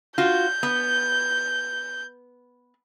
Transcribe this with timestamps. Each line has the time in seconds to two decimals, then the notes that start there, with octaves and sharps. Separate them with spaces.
0.18 F4 F#4 G6
0.63 B3